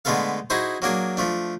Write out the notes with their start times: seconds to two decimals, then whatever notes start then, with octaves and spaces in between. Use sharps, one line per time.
0.05 D3 G#3 A3 B3 A4 F5
0.50 D#4 E4 F#4 G#4 C5
0.82 F#3 A#3 D4 G#4
1.17 F3 A3 D4